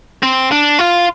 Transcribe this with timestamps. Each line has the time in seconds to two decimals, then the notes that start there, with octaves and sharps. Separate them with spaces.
0.23 C4
0.52 D4
0.79 F4